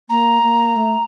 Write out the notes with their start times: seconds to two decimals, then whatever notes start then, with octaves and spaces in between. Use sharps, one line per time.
0.09 A#3 A#5
0.43 A#3
0.76 A3